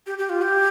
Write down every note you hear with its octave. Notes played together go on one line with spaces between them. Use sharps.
G4
G4
F4
G4